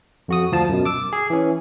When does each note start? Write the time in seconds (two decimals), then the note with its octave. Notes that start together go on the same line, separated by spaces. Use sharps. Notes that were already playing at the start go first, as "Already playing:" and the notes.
0.28 F2 F#4 D#6
0.52 D2 F3 A5
0.69 F#2 B2
0.85 D6 E6
1.13 G#4
1.30 E3 C#4